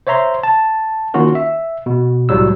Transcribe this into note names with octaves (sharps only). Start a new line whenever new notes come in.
C5 C#5 E5 A#5 C6
A5
D#3 A#3 C#4 F4 F#4 A#4
E5
B2
C2 A2 F#3 G3 E6